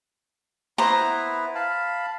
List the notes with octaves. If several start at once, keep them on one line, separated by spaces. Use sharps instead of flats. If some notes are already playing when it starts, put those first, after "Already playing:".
B3 E4 B4 C5 A#5
F5 A5 B5